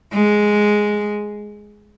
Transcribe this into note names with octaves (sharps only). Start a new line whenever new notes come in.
G#3